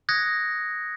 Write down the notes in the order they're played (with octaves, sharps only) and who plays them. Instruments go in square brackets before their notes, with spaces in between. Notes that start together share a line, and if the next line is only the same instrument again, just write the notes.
[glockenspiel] D#6 F#6 G#6 A#6 C#7